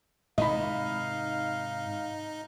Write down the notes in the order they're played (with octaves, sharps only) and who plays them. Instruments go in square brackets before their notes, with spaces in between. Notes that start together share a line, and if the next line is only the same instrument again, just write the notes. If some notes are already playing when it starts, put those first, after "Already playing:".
[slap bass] G#2 C3 D#3 [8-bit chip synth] D#4 [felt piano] D#5 B5 [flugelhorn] F5